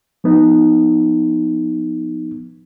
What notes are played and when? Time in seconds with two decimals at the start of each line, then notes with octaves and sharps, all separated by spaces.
0.24 F3 B3 D#4